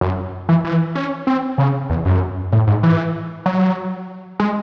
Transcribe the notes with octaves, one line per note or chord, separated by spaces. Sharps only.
F#2
E3
E3
C#4
C4
C#3
E2
F#2
A2
G#2
E3
F#3
G#3